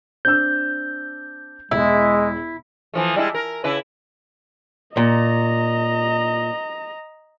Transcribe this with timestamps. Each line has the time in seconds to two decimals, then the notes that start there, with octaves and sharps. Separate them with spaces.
0.25 C4 D4 E6 G6
1.71 E1 G#3 E4
2.93 E3 F3 A3
3.16 G3 G#3 E4
3.34 A#4
3.64 C#3 E4 B4
4.97 A#2 D#5 A#5